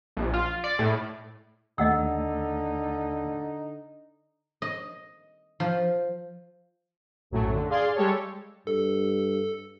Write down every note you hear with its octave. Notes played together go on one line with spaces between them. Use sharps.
A#1
F4
D5
A2
D#2 D3 A3 D#4 D#5 F#5 E6
D#5
F3
A#1 F#2 A2 F#3 A3
D3
G#4 D5 F5 C6
G3 G#3 G4 A4 C#5
G2 A4